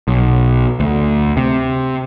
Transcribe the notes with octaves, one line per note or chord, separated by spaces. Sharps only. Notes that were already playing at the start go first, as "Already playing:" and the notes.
B1
D2
C3